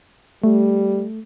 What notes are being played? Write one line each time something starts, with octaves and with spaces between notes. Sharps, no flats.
G3 A3